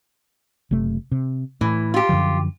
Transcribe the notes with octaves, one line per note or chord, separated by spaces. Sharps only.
F#1 C3 A3
C3
A2 E3
F4 G4
F#2 D3 F3